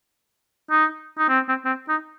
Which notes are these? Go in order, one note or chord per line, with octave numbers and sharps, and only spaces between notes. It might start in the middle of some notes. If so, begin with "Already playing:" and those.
D#4
D#4
C4
C4
C4
D#4